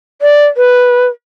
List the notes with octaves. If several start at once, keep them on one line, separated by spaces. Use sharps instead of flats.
D5
B4